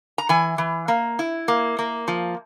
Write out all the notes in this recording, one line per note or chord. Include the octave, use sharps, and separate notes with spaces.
A#5
E3 G#5
E3
A#3
E4
A#3
A#3
F3